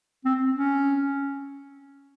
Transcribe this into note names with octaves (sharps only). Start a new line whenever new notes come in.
C4
C#4